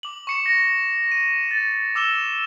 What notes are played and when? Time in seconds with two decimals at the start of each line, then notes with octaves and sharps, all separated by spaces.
0.03 D6 F#7
0.27 C#6 C#7 E7
0.46 A#6
1.12 D#7
1.51 A6
1.95 D6 E6 E7 G7